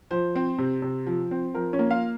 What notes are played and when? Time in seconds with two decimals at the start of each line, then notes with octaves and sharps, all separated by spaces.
0.11 F3 C5
0.35 C4
0.58 C3
0.82 C3
1.07 F3
1.31 C4
1.55 F3 A#4
1.73 C#4 C#5
1.79 A#3
1.90 F4 F5